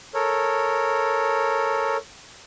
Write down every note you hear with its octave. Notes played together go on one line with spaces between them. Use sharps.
A4 A#4 C#5